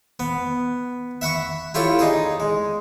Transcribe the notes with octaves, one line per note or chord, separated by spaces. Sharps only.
B3
E5 F#5 B5 C#6
E4 F4 G4 A4 C#5
D#4 G#4 D5
G#3